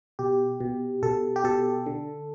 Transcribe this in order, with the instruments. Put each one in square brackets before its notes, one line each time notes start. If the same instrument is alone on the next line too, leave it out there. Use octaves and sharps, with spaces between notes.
[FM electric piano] B2 G4
B2
B2 A4
G4
B2 A4
D3